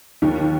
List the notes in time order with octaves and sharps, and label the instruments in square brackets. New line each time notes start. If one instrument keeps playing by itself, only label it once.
[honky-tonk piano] D#2 D#3